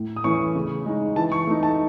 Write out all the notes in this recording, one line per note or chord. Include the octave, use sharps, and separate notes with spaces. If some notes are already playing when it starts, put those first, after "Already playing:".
Already playing: A2
D#6
E3 A3 C#4 C#6
C#3
G#3 D#4
E3 A5
C#6
A3 D#4
A5